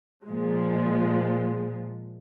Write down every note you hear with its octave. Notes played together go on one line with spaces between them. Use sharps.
A#2 F3 G#3